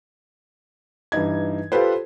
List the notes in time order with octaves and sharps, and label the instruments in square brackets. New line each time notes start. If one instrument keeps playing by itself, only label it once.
[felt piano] G2 E3 D#4 G#6
F4 G4 A4 B4 C5